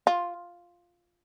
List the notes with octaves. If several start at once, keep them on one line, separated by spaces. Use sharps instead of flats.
F4